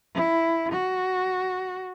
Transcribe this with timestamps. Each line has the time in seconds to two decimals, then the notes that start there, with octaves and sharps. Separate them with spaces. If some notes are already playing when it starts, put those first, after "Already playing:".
0.15 E4
0.72 F#4